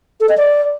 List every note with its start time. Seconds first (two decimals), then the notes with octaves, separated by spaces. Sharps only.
0.20 A4
0.29 D#5
0.37 D5